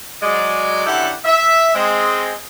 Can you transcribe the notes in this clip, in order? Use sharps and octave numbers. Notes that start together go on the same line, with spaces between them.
F#3 G#3 D5
F#2 D3 E4 G4 A4 F#5
E5
G#3 C4